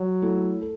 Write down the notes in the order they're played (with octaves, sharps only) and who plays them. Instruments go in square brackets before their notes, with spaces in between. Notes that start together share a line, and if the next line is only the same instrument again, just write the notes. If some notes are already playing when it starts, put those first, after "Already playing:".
Already playing: [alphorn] F#3
[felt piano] A3 E4 A4
A4